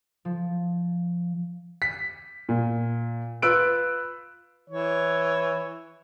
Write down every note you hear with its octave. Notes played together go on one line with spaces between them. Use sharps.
F3
B6
A#2
F4 B4 E6 F#6 D7
E3 C#5